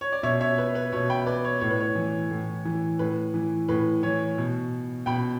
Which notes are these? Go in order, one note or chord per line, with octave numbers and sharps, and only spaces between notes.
C#5
D5
B2 C#5 E5
C#5 E5
B4
B4
B2 C#5
G5 B5
B4 D5
C#5
A2 C#5
B4
C#5
E3
A2
E3
A2 B4
E3
A2 B4
E3 C#5
B2
B2 G5 B5